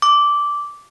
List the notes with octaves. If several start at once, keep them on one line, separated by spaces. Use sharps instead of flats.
D6